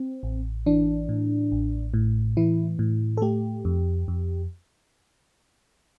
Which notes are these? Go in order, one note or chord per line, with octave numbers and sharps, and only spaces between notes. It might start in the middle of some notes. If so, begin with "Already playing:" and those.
Already playing: C4
A1
E3 D4
A2
A1
A2
E3 E4
A2
A4
A3 G4
F2
F2